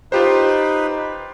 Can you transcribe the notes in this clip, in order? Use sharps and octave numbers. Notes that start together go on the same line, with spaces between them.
D#4 F4 G4 B4 C5